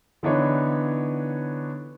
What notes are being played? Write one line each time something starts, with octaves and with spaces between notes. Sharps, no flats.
D3 E3 B3 D4 D#4 C#5